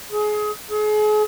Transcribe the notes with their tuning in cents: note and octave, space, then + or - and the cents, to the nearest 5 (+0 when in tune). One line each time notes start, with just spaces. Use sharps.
G#4 +25
G#4 +40